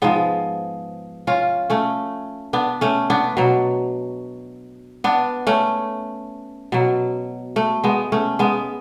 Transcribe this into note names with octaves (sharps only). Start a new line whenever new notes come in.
G#2 F3 G#3 B3
C#4 F4
A3 C#4
B3 D4
A3 C#4
B3 D4
B2 F#3
B3 D4
A3 C#4
B2 F#3
A3
G#3 B3
A3 C#4
G#3 B3